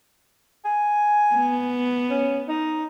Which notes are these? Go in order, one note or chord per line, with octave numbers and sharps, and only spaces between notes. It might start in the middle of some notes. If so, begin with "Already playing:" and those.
G#5
B3
C#4
D#4